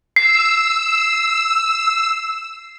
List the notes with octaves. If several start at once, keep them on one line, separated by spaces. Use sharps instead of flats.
E6 C7